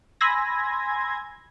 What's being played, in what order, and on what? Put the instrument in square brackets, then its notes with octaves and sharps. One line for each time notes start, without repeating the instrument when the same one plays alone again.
[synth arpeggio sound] G#5 B5 C6 E6 G#6 A#6